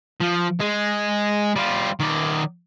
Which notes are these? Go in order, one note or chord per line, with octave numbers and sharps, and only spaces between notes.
F3
G#3
G3 F4
D#3 D5